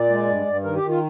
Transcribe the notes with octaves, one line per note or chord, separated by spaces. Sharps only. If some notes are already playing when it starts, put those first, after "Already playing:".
Already playing: A#2 D5
G#3
G2
G2
D#3 A#4
G4
D#3
F4